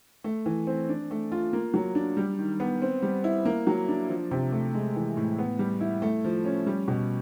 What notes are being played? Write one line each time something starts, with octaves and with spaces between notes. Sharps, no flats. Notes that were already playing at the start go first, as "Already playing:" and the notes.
A3
E3
C4
D4
A3
F4
A#3
F#3
D4
G3
D#3
B3
C4
G3
E4
A#3
F#3
D4
F3
C3
A3
G#3
E3
A2
B3
G3
E4
A3
F3
C#4
G3
B2